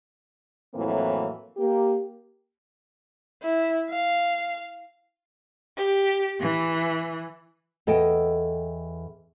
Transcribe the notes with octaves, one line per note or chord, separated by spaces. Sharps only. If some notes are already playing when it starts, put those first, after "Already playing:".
F2 A2 E3 F#3 A#3 C4
A#3 G4
E4
F5
G4
E3
E2 A4 D#5 G5